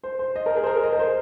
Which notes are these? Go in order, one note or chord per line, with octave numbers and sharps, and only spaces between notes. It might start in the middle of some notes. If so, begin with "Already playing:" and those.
C5
C5
D#5
A#4
G#4
C5
A#4
D#5
A#4
C5